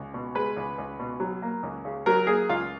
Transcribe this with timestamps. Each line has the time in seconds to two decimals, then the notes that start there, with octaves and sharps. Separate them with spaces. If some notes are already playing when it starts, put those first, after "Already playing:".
Already playing: C#2
0.14 B2
0.35 G#3 B4
0.56 C#2
0.78 C#2
1.00 B2
1.20 F#3
1.42 A#3
1.63 C#2
1.85 C#3
2.06 F#3 A#4
2.27 A#3 G#4
2.49 C#2 F4